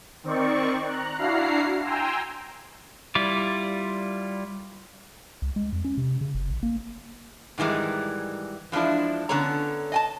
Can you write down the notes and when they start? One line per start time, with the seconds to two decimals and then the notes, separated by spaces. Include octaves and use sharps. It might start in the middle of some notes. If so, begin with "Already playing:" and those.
0.24 D#3 C4 D5 C#6
0.86 A#5 F#6
1.18 D4 E4 F#4 F5 A#5 C7
1.84 G5 G#5 A#5 C6 E6
3.15 G3 E4 F4 D5
5.42 C#2
5.56 G#3
5.73 F2
5.84 C#4
5.98 C3
6.21 C#3
6.34 F#1
6.50 A1
6.63 A#3
7.58 G#2 D#3 E3 G3 G#3
8.72 E3 F3 G#3 D4 E4
9.29 D3 B3 C#4 A4 C#5 A#5
9.92 D#5 G#5 A5